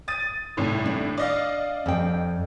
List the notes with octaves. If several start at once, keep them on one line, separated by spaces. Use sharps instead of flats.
D#6 A6 D#7
C2 A2 D#3
D4
D5 D#5 F5
F2 G5